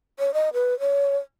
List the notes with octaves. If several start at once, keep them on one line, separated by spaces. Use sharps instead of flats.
C#5
D#5
B4
C#5